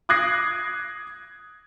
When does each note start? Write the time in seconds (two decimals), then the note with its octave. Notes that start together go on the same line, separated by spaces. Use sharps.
0.09 D6 D#6 F#6 G#6 A#6 C7